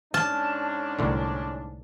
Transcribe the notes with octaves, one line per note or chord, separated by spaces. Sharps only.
G#2 C#4 D4 A5 F6
C2 A2 D3